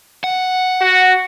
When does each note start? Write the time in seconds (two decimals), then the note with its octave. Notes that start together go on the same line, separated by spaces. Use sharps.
0.24 F#5
0.81 F#4